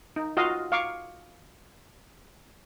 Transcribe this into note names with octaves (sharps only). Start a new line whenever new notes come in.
D#4
F4 F#4 D#5 F5
F5 C#6 D6